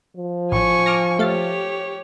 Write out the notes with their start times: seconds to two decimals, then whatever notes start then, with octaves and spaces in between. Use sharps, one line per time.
0.17 F3
0.52 A1 G#5 C#6
0.86 D6 F6 A#6
1.19 A3 G4 C#5 F5 A6